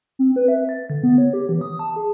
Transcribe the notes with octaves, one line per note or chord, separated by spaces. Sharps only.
C4
B4
E5
A6
D3
B3
C#5
G4
E3
D#6
A5
G#4